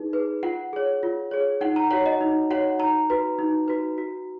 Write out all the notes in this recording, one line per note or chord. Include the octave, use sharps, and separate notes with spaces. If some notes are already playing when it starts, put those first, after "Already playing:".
Already playing: D#4 G#4 B4
G#4 B4
F4 F#5
G#4 C#5
F4
G#4 C#5
D#4 F#5
A#5
F#4 C#5 F#5
D#5
D#4
F#4 C#5 F#5
D#4 A#5
F#4 B4
D#4
F#4 B4
F#4